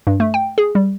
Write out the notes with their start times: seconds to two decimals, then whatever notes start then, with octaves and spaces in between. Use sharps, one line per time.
0.07 G2
0.20 A3
0.34 G5
0.58 G#4
0.75 G3